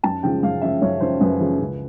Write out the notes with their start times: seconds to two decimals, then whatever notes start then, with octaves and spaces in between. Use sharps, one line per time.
0.04 F#2 A5
0.23 C#3 F3 G#3 G5
0.43 F#2 F5
0.61 C#3 F3 G#3 E5
0.82 F#2 C#5
1.00 C#3 F3 G#3 C5
1.21 F#2 B4
1.40 C#3 F3 G#3
1.60 C#2